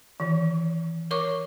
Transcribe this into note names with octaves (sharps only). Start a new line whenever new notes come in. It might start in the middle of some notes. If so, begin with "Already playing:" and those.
D#3 E3
A#4 C#5 C#6 D6